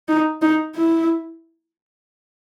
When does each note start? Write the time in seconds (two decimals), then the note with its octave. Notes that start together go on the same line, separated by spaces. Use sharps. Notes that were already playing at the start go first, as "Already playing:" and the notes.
0.08 D#4
0.42 D#4
0.75 E4